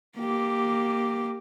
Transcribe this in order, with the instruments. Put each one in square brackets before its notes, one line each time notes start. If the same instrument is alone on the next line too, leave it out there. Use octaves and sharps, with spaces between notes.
[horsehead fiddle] A#3 G4